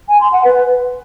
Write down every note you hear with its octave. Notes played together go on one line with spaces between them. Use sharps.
G#5
C6
F#5
B4